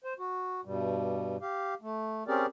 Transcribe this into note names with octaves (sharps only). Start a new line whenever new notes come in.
C5
F#4
G2 B2 G3
G4 F5
A3
C4 C#4 G4 G#4 A#4 D5